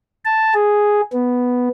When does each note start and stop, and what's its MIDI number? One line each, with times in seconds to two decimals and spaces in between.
0.25 0.54 81
0.54 1.01 68
1.12 1.69 59